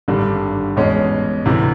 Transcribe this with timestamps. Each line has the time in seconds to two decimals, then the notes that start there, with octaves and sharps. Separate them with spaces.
0.08 G#1 G2 D3 G3
0.76 E2 B2 G#3 C#4
1.46 D2 C3 E3